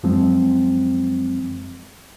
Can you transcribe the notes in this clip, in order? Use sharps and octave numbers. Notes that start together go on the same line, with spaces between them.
F#2 F3 F#3 G#3 C4